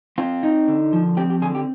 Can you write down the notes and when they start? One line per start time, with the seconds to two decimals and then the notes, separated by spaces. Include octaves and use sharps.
0.18 C4 F4
0.43 D#4
0.68 D3
0.93 F3
1.17 C4 G4
1.30 G4
1.42 D3 G#4
1.55 G4